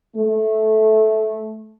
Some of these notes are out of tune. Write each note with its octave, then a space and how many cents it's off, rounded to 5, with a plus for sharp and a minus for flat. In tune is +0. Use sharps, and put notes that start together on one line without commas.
A3 -10